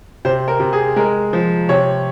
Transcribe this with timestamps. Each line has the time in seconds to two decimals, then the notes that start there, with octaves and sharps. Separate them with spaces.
0.25 C3 C5
0.48 A#4
0.60 C3
0.73 G#4
0.96 G#3 A#4
1.33 F3
1.69 C3 C#5